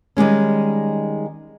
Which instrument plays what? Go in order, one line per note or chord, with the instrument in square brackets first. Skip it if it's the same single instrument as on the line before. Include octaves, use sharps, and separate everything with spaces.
[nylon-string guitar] D#3 G3 G#3 C#4